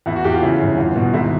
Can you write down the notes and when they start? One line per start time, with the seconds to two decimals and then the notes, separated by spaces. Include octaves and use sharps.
0.06 E2 E4
0.16 F#4
0.24 E2 G4
0.33 F4
0.42 C#3 E4
0.61 G1
0.77 E2 F4
0.96 B2
1.14 G#1 E4